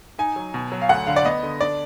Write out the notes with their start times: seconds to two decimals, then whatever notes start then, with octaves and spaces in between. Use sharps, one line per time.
0.19 D#4 G#5
0.36 F#3
0.54 B2
0.72 F#3
0.82 F5
0.89 D2 F#5
1.07 D3 F5
1.16 D5
1.25 B3 D#5
1.43 D3
1.61 D4 D5